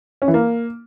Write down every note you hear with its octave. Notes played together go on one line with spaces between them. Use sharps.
C#4
E3
A#3